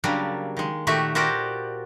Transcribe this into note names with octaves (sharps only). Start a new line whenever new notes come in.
C#3 F#3 G3 A#3 D4
D#3 G#3
A#2 D#3 A3 F#4 G4 E5
F#4 G4 A#4 C5 D5